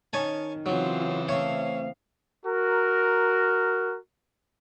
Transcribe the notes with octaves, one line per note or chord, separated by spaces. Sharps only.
D#3 C#4 D#4 C#5 G#5 A5
C#3 E3 F#3 C4 F4
A3 C4 C#5 F5
F#4 A#4